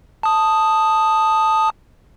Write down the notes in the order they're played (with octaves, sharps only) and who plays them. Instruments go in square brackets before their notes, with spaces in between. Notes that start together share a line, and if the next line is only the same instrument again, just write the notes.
[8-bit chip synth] A5 D#6